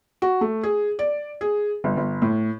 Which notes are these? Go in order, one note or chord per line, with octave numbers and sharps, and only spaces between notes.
F#4
A3
G#4
D5
G#4
G1
G1
A2